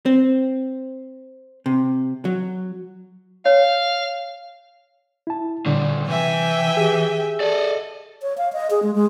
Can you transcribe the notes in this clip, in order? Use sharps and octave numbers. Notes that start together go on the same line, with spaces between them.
C4
C3
F#3
C#5 F5
E4 A5
A#2 D3 G3 F4
C3 E3 E5 G5 G#5
G4 G#4
A4 D5 D#5
C#5
F5
D#5
G#4
G#3
G#3